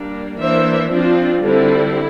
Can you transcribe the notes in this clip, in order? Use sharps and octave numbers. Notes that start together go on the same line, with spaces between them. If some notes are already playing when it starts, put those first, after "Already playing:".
Already playing: G3 A#3 D4
E3 A#3 D4 C5 E5
F3 C4 D4 F4
D3 G3 C4 E4